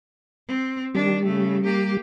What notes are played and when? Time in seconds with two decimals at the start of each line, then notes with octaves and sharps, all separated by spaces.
0.48 C4
0.95 D#3 G3 D4
1.25 C#3 A3
1.64 A#3 G4